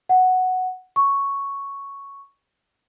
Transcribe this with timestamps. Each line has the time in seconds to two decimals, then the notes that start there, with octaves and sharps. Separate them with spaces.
0.09 F#5
0.96 C#6